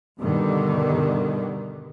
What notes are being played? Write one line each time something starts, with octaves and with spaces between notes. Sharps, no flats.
G2 B2 D3 D#3